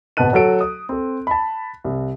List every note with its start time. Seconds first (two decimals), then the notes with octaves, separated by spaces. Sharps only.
0.17 D1 B2 B4 A5 F#6 D#7
0.33 F#3 F#4 A4 D7
0.61 D#6
0.89 C4 A4
1.27 A5 B5
1.84 C2